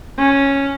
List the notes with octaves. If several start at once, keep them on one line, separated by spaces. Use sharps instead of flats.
C#4